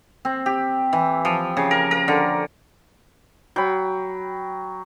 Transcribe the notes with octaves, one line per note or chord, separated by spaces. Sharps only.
C4
G4
E3
F3
C#3
A#4
A#4
D3
F#3 G5 B5